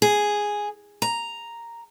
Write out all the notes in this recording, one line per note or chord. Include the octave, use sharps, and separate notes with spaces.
G#4
A#5